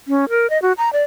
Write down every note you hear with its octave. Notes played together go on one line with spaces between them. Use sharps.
C#4
A#4
D#5
F#4
A#5
D5